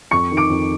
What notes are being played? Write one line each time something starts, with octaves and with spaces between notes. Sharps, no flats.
F2 C#6 C#7
D#3
D6 D7
F2